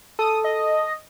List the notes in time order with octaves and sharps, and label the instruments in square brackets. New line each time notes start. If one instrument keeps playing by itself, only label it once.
[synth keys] A4 [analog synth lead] D#6
[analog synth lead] D#5